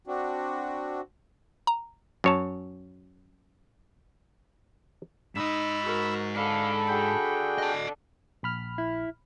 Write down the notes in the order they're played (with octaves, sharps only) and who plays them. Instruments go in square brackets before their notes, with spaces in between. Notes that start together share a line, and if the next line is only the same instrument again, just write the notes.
[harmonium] C4 D4 F#4
[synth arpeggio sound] A#5
[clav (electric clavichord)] F#2 C#5 A5
[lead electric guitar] G#2 D#5 [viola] D#4 [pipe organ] B5 E6
[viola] F#4 A#4
[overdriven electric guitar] D4 A4 [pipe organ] F5 [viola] B5
[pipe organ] F#4 G#4 G5
[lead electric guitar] D#5 A5
[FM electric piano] A#1 B5 F6
[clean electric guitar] E4